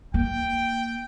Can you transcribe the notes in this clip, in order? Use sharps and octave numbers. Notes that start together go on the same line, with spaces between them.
A#3 G5